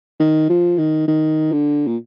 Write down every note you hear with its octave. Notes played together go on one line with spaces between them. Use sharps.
D#3
F3
D#3
D#3
D3
A#2